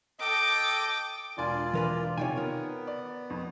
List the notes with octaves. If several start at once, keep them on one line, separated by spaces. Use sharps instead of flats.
A4 D#5 G5 D6
E1 D4 F4 D5 G#5
E3 A#4 B4
C3 D#3 F4 C#5 G5 G#5
B3 A#4
D5
F2